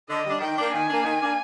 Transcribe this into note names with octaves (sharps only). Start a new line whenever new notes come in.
D3 D#5
G3 D4
D#3 G5
A#3 D4
D#3 G#5
A#3 D4
D#3
A#3 D4